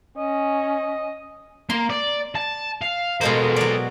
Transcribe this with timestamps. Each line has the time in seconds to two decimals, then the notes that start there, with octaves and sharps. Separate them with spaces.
0.18 C#4 D#5
1.70 A#3 C6
1.90 D5
2.35 A5
2.82 F5
3.21 B2 G#3 A#3 A4 C5
3.56 F#3 D5